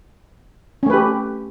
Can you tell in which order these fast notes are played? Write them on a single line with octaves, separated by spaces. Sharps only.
C#4 A3 B4 G4